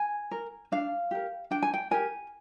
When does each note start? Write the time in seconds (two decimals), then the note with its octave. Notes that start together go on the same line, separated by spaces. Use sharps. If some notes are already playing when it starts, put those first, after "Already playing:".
Already playing: G#5
0.31 A#4
0.72 D4 F5
1.11 G4 A#4
1.51 D4 G5
1.62 G#5
1.74 G5
1.91 G4 A#4 G#5